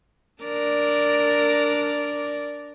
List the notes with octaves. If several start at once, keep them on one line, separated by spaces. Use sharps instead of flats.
D4 A#4 D5